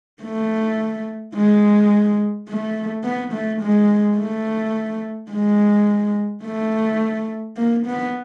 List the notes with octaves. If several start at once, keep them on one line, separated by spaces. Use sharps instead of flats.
A3
G#3
A3
B3
A3
G#3
A3
G#3
A3
A#3
B3